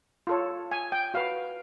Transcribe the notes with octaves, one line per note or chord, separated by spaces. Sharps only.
F4 A4 C#5
G#5
G5
F#4 B4 F5